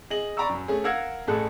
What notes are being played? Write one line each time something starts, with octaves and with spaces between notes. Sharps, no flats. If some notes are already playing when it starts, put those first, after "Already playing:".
G#4 D#5 F#7
D5 A#5 B5 C#6 E6
F#2
A3 C#4 G#4
A#4 F5 F#5 E6 G#6 A#6
A1 A3 G#4 A4 F#6